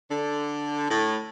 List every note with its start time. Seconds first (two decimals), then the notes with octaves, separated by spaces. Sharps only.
0.11 D3
0.90 A2